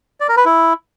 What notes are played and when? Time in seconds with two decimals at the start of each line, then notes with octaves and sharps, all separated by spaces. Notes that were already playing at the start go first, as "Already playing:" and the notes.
0.20 D5
0.29 A#4
0.37 B4
0.45 E4